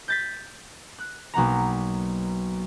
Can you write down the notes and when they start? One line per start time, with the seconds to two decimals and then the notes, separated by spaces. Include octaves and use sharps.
0.08 G6 A6 B6
0.99 F#6
1.34 B1 A#3 F#5 A#5